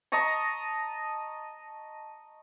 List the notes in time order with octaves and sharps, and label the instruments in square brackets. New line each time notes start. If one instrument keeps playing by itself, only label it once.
[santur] D#5 A5 A#5 C#6